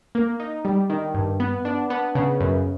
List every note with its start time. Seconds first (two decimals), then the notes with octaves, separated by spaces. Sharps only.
0.15 A#3
0.40 D#4
0.65 G3
0.90 D#3
1.14 G2
1.40 B3
1.65 D4
1.90 B3
2.15 C#3
2.40 F#2